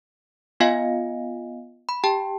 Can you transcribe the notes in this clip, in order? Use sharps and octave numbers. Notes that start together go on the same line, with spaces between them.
B3 F4 D#5 F5 G#5
B5
G4 G5 A5